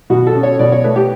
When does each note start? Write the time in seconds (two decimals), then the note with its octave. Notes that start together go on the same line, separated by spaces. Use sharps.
0.10 B2 F#4
0.27 A4
0.34 C#4
0.43 C#5
0.59 B2 D5
0.72 C#5
0.84 A3 B4
0.96 G4